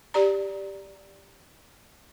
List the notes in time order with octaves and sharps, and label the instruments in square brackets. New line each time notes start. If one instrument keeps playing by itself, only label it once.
[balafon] G4 D5 A#5